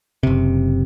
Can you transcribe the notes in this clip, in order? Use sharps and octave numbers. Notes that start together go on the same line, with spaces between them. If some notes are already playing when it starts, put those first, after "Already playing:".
F#1 C3